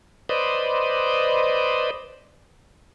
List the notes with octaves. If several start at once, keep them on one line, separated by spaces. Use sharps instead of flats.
B4 C5 D5 D#5